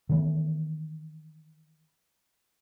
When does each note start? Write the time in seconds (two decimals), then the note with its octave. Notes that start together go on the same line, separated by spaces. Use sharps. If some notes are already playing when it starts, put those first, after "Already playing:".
0.09 D#3 E3 A3 B3